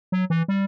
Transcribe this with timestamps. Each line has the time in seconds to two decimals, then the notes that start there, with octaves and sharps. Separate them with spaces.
0.12 F#3
0.30 E3
0.48 G3